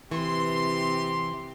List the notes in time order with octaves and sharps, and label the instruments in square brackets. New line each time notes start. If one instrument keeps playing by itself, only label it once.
[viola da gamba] C3 C4 G4 [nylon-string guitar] E3 [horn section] C6